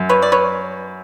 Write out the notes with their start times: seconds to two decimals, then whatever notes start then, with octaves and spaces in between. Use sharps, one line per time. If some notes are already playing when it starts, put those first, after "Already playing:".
Already playing: F#2
0.09 B4 C#5
0.22 D5
0.32 B4 C#5